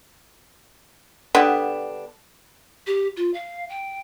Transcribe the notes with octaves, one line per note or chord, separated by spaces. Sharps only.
D3 G3 B3 D4
G4
F4
F5
G5